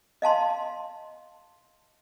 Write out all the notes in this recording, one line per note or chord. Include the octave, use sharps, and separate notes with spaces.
D#5 F5 A5 C6